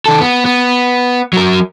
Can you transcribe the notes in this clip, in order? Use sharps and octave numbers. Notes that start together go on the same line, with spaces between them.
D#3 A4
B3
B3
F#3 A#4